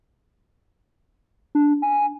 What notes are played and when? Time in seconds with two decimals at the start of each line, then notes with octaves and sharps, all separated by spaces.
1.55 D4
1.82 G#5